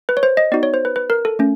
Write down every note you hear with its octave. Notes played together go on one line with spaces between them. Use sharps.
B4
C#5
C5
D#5
B3 D#4 F#4 D5
C#5
C5
B4
B4
A#4
A4
A3 C#4